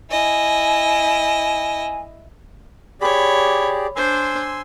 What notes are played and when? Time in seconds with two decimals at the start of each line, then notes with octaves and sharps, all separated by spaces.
0.11 E4 D#5 G#5
3.01 G4 G#4 C#5 D5 B5
3.96 D4 C5 G#5 C6 E6